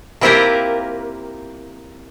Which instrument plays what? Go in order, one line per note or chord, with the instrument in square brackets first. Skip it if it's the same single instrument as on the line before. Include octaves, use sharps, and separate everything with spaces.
[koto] A#3 C4 E4 F4 G4 A#4